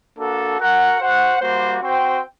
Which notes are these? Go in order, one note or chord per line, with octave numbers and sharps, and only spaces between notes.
A#3 D4 F#4 A4
F#4 A#4 F#5
F#4 C5 F#5
G3 A#3 F#4 C5
C4 F#4 C5 G5